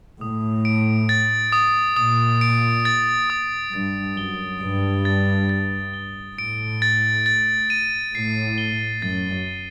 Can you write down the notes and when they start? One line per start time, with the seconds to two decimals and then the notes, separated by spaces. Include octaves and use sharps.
0.21 A2 D#6
0.65 D7
1.09 A6
1.52 D#6
1.96 A#2 D#6
2.41 D7
2.85 A6
3.30 D#6
3.73 G2 A6
4.17 F#2 G7
4.61 G2 D7
5.05 A6
5.49 A6
5.93 G7
6.38 A2 D7
6.82 A6
7.26 A6
7.70 D#7
8.15 A2 C7
8.58 G7
9.02 F#2 A6
9.47 D#7